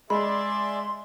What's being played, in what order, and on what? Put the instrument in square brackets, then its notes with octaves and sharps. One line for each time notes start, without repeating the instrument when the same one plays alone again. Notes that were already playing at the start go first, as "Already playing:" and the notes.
[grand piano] G#3 [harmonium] G#4 D5 E5 [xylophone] B5 [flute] C6